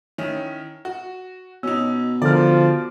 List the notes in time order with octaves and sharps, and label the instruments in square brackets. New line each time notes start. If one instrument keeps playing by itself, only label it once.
[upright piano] D#3 C#4 E4
F#4
[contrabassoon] B2 [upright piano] C#4 D#4 [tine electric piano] E6
[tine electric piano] D3 F6 [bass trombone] F3 [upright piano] A#4 D5